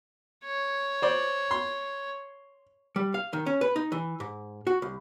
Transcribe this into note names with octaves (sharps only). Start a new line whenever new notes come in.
C#5
C5 D5
C6
G3
F5
D#3
C#4
B4
D#4
E3
G#2
F#4
C2